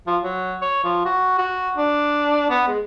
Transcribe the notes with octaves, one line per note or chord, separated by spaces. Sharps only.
F3
F#3
C#5
F3
F#4
F#4
D4
B3
G#3